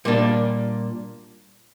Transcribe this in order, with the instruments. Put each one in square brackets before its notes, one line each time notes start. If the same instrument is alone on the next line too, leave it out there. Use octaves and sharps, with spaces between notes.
[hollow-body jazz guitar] A#2 G3 A#3 D4